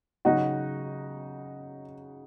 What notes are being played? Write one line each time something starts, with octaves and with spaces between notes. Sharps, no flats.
C#3 F#3 D#4 F#4